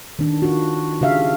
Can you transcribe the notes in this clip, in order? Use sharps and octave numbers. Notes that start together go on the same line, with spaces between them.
D#3 D4
D4 F4 F#4
C#3 D4 F#4 G4 E5 F5